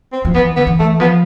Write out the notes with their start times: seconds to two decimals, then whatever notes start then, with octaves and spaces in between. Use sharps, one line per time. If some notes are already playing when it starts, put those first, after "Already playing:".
0.12 C4
0.25 F3
0.34 E3 B3
0.56 D3 B3
0.67 E3
0.79 A3
1.00 F3 B3